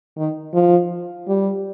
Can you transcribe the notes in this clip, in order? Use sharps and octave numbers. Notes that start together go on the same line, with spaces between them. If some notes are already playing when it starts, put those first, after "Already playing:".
D#3
F3
G3